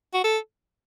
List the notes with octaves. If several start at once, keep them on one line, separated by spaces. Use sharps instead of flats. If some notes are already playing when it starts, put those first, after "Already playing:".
F#4
A4